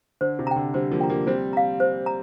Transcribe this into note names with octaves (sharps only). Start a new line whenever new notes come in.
D3 C5
C3
G5 A#5
D3
D3 G3 C5
F3 A#3
G5 A#5
F3 A#3
G3 C4 C5
F5 A#5
C5
A#5